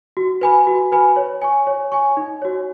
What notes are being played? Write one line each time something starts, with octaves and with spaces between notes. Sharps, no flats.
F#4
B4 G#5 B5
F#4
B4 G#5 B5
C#5
G#5 C#6
C#5
G#5 C#6
D#4
F#4 C#5